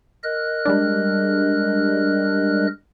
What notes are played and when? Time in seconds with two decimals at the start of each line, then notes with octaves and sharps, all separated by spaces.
0.23 A#4 D#5 F#6
0.65 G3 G#3 D4